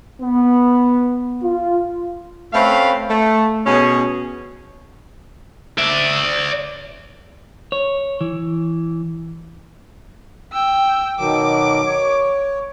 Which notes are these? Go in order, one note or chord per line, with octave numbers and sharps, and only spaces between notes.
B3
F4
A3 C4 C#4 B4 E5 F5
A3
B2 C#4 G#4
D5 E5
C#5
E3
G5 E6
B2 D#3 F#3 D6
C#5